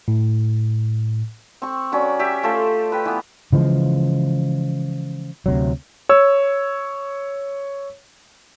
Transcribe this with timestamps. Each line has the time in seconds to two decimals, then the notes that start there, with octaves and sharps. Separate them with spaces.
0.08 A2
1.62 C4 C#6
1.92 F#3 C#4 D5
2.19 G4 E5
2.43 A3 F4 A4 C5
2.92 B4 G5
3.05 E3 B3
3.52 C#3 E3 F3 G#3
5.46 D2 C3 F#3
6.09 C#5 E6